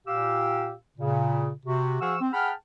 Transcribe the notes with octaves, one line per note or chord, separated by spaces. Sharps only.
A#2 G4 F5 E6
A#2 C#3
C3 F#4
F3 F#4 G#4 F5 C#6 E6
C4
G#4 F#5 G5 A5 B5 F6